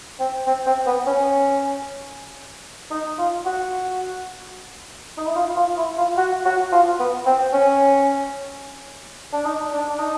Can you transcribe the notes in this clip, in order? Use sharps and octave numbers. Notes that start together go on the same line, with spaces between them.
C4
C4
C4
B3
C#4
D#4
F4
F#4
D#4
E4
F4
F4
E4
F4
F#4
F#4
F4
B3
C4
C#4
D4
D#4
D4
D4
D#4